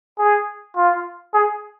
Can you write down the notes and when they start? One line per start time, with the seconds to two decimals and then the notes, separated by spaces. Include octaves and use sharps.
0.19 G#4
0.76 F4
1.34 G#4